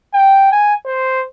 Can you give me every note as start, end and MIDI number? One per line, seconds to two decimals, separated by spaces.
0.13 0.47 79
0.52 0.74 80
0.86 1.23 72